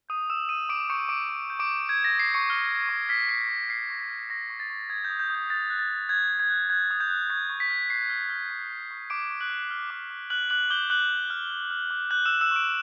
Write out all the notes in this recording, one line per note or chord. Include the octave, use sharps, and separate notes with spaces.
D#6 G6 D#7
D6 E6 E7
D#6 G6 D#7
D6 G6 D7
C#6 G6 C#7
D6 D7
D6
G6
D6 D7
G6
G6 G#6
A#6
D6
C7
G6
C#6 C#7
F6
F6
C#6
F6 B6
F6 C7
C#6
F6 C7
C#6 A#6
B6
F6
C#6 A#6
C#6
A6
C#6
D#6 G#6
G6
D#6
G6
D#6 G6
F#6 A6
F#6
A6
F#6
F#6 G#6
F#6
G#6
F#6
F#6 G#6
D#6
G6
F#6
C#6 G#6
C#6
B6
F6
C#6 C7
F6
F6
C#6
F6
C#6
C#6 D6 D7
C#6
F#6 F#7
F6
F6
D6
D6
F6 F#6 F#7
D6 F#6 F#7
D6 G6 G7
D6 F#6 F#7
F6
F6
F6
F6
D6
F#6 G6 F#7
E6 E7
G6
E6 E7
C#6 D6 D7